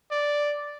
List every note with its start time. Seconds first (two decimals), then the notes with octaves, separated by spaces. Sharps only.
0.11 D5